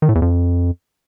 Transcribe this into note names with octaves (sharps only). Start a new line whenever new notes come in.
D#3
A2
E2
F2